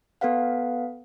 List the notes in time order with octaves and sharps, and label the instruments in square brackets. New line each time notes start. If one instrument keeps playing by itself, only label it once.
[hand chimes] B3 A4 B4 F5 F#5